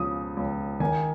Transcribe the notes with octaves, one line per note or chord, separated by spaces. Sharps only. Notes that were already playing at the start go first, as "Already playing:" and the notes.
Already playing: C#2 C#3 F3 D#6
C#2
D#3 G#5